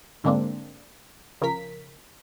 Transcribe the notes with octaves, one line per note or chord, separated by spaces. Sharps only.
G#2 D3 G#3 A#3 C4 D4
C#2 C#3 F3 A#4 B6